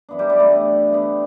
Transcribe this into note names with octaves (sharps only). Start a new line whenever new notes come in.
F#2 E3 B3 D4
G3 G4
G3 G4
A3 A4
D4
D3 G3 B3 D4